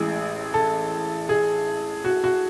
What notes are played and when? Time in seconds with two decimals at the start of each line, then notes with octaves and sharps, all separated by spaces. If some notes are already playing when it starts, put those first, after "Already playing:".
Already playing: A1 A2 G#3 G#4
0.54 A4
1.29 G#4
2.05 F#4
2.24 F#4